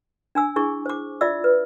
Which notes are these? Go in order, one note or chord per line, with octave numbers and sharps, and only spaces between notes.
D4 G#5 E6
D4 E4 G#4 C#6
C5 D6
F4 D5 E5 E6
B4